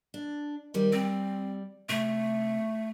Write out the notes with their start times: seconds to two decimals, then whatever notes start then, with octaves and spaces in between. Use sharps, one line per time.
0.14 D4
0.74 D#3 G3 C4
0.92 G3 C4
1.89 C3 A3